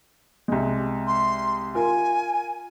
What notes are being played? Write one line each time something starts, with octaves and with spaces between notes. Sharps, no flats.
C2 G#3
C6
F4 A#4 G#5